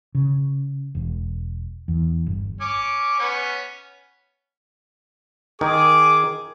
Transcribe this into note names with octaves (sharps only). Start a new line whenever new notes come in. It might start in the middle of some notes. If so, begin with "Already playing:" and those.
C#3
E1
E2
G1
C#4 D6
B3 C#4
D#3 G#4 D6